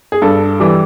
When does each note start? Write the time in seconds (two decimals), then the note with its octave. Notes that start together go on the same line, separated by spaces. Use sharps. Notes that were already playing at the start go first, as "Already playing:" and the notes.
0.12 G#4
0.22 G2 A4
0.60 E3 G3